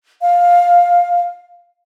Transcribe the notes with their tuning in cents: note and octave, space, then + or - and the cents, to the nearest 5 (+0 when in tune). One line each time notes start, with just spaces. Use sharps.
F5 +10